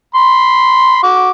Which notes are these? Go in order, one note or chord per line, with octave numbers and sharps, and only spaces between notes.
B5 C6
F#4 D6